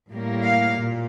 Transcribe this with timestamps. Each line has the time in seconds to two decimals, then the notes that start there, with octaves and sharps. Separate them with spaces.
0.11 A2 G3 A#3
0.44 F5
0.78 A#2